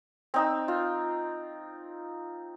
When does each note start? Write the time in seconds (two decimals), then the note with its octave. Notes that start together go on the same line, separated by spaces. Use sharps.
0.34 C4 D#4 E6
0.68 F4